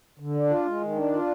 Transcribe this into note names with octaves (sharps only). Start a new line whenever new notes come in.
D3
D4
F4
G#3
D#3
D4
F4